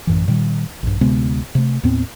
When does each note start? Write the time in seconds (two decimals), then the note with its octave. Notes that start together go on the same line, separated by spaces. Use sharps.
0.07 A1 F#2 E3
0.28 A#2 D#3 G3
0.83 A#1 G2
1.01 D2 C3 G#3 B3
1.55 C3 A3
1.83 D#2 A2 B3 C4